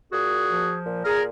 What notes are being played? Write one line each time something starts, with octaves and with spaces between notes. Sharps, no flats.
A#2 F#4 G#4
F3
A#2
G#4 A#4